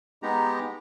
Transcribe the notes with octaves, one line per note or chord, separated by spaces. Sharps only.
G#3 B3 D#4 G4 A#5